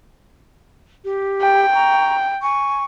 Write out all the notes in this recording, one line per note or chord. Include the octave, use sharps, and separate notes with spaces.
G4
G5
A#5 C#6
G#5 C#6